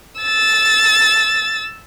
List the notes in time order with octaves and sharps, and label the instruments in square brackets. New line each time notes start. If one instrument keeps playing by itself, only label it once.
[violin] E6 A6